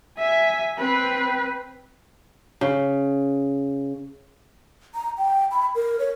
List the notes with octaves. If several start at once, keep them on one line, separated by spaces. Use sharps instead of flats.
E5 G#5
C4 B4
C#3
A#5
G5
B5
A#4
C#5